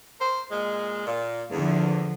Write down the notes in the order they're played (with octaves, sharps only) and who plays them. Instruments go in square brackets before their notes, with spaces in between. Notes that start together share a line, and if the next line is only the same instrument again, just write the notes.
[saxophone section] A#4 C5
A#2 G#3
A#2
[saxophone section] E2 [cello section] D3 F3